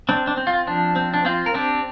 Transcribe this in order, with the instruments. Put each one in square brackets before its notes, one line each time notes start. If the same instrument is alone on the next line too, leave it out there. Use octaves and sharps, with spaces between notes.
[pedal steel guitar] C4 D4
D4
C4
F4
F3 D4
C4
D4
C4 F4
A#4
C4 D4 G4